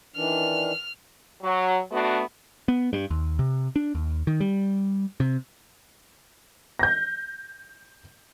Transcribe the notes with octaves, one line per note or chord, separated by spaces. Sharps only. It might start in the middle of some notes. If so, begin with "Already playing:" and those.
D#3 E3 D4 F6
F#3
A3 B3 D4 F#4
B3
G2
D#2
C3
D4
D#2
D#3
G3
C3
G6 A#6